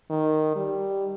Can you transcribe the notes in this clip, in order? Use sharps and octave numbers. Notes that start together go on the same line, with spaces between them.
D#3
G3